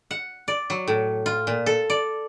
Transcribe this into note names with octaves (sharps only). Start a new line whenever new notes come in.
F#5
D5
F#3
A2
F4
A#2
A4
D5